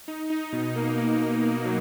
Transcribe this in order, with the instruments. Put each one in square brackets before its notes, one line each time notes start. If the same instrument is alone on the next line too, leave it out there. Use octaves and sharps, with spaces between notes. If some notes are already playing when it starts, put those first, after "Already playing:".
[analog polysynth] D#4
D#4
B2
A#3
A#3
D#4
A#3
F#3